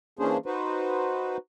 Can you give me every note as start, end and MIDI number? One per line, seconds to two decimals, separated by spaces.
0.19 0.37 52
0.19 0.37 58
0.19 0.37 61
0.19 0.37 62
0.19 0.37 68
0.19 0.37 72
0.46 1.37 63
0.46 1.37 66
0.46 1.37 71
0.46 1.37 72